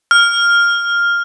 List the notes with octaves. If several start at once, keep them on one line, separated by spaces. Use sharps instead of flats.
F6